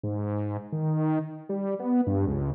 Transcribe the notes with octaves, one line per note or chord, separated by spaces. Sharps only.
G#2
D#3
G3
B3
G2
C#2